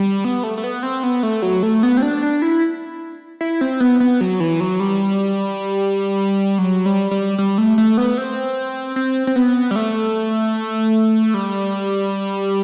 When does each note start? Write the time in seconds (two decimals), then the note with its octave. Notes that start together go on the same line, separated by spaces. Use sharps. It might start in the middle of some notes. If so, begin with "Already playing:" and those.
Already playing: G3
0.25 B3
0.44 A3
0.58 A3
0.64 B3
0.83 C4
1.03 B3
1.23 A3
1.42 F#3
1.63 A3
1.83 B3
1.97 C4
2.02 D4
2.23 D4
2.42 E4
3.41 E4
3.61 C4
3.80 B3
4.00 B3
4.21 F#3
4.40 E3
4.60 F#3
4.80 G3
6.58 F#3
6.86 G3
7.11 G3
7.38 G3
7.58 A3
7.78 A3
7.98 B3
8.18 C4
8.96 C4
9.27 C4
9.36 B3
9.71 G3
9.76 A3
11.34 G3